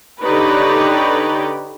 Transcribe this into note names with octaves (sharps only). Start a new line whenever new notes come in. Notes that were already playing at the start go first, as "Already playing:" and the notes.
D3 D#4 G4 B4 C#5 D5